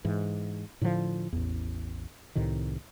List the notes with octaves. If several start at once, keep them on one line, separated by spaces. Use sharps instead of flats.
G#2 E3
A2 D3 D#3 F3
A1 E2
C2 A2 C3 D#3